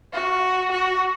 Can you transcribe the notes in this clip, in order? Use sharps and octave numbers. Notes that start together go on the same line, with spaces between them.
F#4
F#4